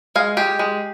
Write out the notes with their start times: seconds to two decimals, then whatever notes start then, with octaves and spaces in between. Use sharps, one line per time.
0.15 G#3 F5
0.37 G#3 G4
0.59 G#3